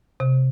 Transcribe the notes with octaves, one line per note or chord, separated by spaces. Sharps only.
C3